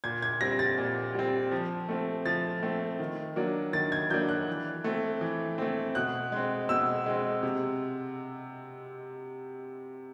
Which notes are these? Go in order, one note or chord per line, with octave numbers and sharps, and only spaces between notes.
A#2 G#6
G#6
G3 C4 A#6
A6
A#2
G3 C4
F3
A3 C4
F3 A6
A3 C4
D#3
F#3 A#3 D4
D#3 A6
G#6
F#3 A#3 D4 G6
F#6
E3
A3 C4
E3
A3 C4
B2 F#6
G#3 C4
B2 E6
G#3 C4
C3